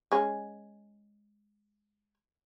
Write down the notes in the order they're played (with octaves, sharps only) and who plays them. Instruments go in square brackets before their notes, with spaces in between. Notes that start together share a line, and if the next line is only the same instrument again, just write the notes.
[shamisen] G#3 C#4